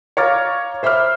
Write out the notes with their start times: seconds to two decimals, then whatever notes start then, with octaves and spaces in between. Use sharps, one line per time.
0.17 C#5 F5 A#5 D6 F6 A6
0.83 C5 E5 B5 D6 F6